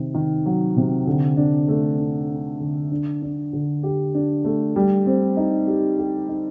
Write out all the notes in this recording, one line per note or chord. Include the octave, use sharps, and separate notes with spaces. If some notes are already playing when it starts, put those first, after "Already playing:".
Already playing: C3 D#3
D#3
F#3
C3
D3
D4
A3
D4
D4
D3
D4
D4
D3
G4
D4
A3
G3
C4
D#4
G4
G4
D#4